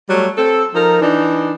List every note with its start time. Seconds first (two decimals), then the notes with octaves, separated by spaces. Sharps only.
0.09 F#3 G3 A3
0.37 C4 A4
0.74 F3 D#4 A#4
1.01 E3 D4 D#4